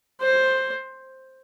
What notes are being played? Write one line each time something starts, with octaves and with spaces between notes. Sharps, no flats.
C5